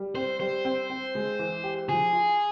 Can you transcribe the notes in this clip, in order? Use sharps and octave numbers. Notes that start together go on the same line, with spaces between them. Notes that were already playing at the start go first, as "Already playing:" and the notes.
Already playing: G3
C4 C5
G3 C5
C4
C4
G#3
E3
G4
F3 G#4
F4